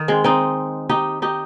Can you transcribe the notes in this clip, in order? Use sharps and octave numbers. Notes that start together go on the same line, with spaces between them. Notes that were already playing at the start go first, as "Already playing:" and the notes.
Already playing: D#3
G#3 C4
C4 D#4
D#4 G4
D#4 G4